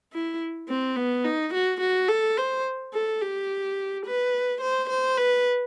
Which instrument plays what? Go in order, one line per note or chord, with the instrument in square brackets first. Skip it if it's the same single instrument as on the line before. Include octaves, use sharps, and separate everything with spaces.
[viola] E4
C4
B3
D#4
F#4
F#4
A4
C5
A4
G4
B4
C5
C5
B4